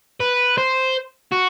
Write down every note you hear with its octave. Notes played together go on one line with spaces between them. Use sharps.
B4
C5
F#4